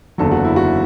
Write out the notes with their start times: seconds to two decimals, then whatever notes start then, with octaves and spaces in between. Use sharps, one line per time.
0.18 F#1 E2 D3 F#3 A4
0.31 F#4
0.45 E4
0.56 F#4